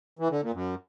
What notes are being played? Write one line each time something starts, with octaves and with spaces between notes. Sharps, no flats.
E3
D3
A#2
F#2